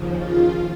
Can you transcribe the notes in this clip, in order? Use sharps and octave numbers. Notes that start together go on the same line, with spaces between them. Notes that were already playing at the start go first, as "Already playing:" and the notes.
Already playing: D#2 C#3 F3
F4